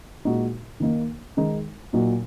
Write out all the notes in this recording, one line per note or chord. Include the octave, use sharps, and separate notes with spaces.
A#2 G#3 D#4 F#4
D#3 A#3 D#4
D#3 G#3 D#4
A#2 F#3 D#4 F#4